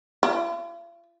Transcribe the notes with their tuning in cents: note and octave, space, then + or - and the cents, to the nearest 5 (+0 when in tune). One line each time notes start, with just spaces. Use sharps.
F4 -45